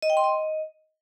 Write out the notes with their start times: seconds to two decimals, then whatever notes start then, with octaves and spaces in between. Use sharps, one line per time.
0.02 D#5
0.10 G5
0.17 C6
0.24 D#5